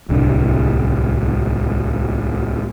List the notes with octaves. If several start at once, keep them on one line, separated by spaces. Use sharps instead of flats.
D1 C2 D4